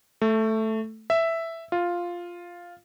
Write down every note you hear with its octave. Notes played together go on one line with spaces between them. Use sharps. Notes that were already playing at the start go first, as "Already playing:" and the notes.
A3
E5
F4